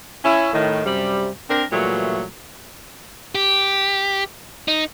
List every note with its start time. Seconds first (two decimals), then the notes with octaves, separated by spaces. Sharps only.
0.25 C#4 E4
0.54 A2 D#3
0.85 F#2 C3 G3
1.50 C4 D4 A#4
1.72 A#2 E3 F#3 G3 A3
3.35 G4
4.68 D#4